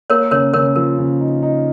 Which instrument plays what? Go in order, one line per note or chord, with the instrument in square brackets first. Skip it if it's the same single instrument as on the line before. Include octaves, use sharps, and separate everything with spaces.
[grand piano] A#3 [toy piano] A#4 C#5
[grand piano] C#3 [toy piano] A#4 C#5
[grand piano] C#3 [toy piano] A#4 C#5
[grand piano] F3 [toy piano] A#4
[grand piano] C#3
D#4
D#4